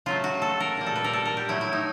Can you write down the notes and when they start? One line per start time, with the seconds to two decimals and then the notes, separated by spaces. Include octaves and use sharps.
0.06 C#3 F#3 A3 F4
0.24 F#4
0.42 A4
0.60 A#4
0.77 A#2 G3
0.86 A4
0.96 B4
1.04 A#4
1.13 A4
1.25 A#4
1.37 G4
1.48 A2 F#3 A3 E4
1.61 E4
1.73 D#4